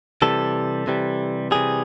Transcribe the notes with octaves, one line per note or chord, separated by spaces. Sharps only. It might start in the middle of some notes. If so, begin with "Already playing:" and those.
C3 E3 G3 A4
C3 E3 G3
C3 E3 G3 G#4